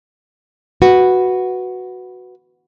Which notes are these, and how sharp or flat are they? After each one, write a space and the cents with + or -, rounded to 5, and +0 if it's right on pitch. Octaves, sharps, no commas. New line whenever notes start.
F#4 +0 B4 +0